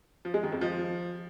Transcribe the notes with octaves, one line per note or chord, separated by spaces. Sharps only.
F3
G#3
D#3
F2
F3